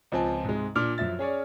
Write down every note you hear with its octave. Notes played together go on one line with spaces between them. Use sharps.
C#2 F3 C4 G#5 A5
G#2 C3 G#3
A#2 D4 D6 F6
F#2 F3 E5 A6
C#4 G#4 C#5 D5